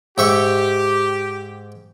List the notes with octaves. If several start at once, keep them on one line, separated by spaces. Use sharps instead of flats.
G#2 G4 E5 C#6